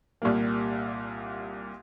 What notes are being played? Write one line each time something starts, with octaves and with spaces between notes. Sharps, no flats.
C2 A#2 G3 A#3